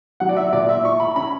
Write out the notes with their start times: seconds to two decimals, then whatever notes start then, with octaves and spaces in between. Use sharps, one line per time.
0.20 F#3 F#5
0.29 D5
0.37 E5
0.52 A#2 D5
0.69 E5
0.84 E4 C#6
1.00 B5
1.16 C#4 B5